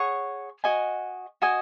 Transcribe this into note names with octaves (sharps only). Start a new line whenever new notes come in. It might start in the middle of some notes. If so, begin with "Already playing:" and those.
Already playing: G#4 C#5 F#5 C#6
F#4 D#5 G#5
F#4 D#5 G#5